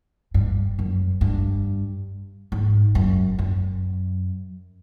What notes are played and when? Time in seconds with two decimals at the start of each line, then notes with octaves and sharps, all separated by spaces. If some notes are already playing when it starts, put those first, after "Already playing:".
0.34 G2
0.79 F#2
1.21 G2
2.52 G#2
2.95 F#2
3.39 F#2